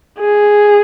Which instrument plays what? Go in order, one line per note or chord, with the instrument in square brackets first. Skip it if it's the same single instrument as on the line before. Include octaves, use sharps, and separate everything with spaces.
[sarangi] G#4